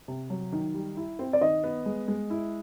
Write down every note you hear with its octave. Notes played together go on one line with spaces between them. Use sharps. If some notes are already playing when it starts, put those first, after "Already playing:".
C3
F#3
D#3
G3
E4
C4
D5
D#3 D#5
B3
G#3
G#3
E4